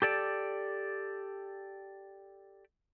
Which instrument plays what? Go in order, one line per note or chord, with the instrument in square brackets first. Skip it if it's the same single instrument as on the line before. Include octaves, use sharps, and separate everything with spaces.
[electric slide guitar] G4 A4 D5